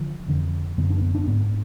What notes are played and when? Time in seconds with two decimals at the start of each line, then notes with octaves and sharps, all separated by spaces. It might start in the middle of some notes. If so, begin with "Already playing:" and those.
Already playing: D3 F3
0.28 F2 D3
0.78 F#2 D3 B3
0.90 D4
1.02 B3
1.15 D4
1.27 G#2 B3